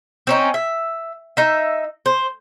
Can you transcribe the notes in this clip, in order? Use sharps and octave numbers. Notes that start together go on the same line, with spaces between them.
C4 C#4 D#4
E5
D#4 E5
C5